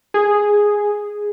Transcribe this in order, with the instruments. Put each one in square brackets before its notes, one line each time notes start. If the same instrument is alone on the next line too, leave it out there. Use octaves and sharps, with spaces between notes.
[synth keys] G#4